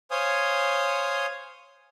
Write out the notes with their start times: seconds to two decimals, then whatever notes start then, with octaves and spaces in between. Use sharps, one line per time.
0.11 C5 C#5 F5 G#5 D#6